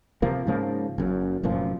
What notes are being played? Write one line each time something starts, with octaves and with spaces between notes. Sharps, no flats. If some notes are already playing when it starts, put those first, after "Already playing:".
C3 F3 A#3
G#2 C#3 F3 A#3
F#1 F#2
F1 F#2 A#2 F3